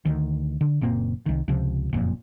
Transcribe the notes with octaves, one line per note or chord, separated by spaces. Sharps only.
D2 D#3
D3
F#1 A#2 A#3 C4
C2 D#3
C#2 C3 F3
F#1 F2 A#2